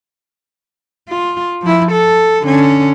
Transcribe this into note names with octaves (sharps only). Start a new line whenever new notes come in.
F4
F3 E4
A4
D3 C#4